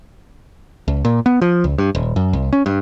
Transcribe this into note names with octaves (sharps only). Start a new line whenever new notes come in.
C#2
A#2
B3
F3
C#2
G2
D#1
F#2
C2
C#4
G2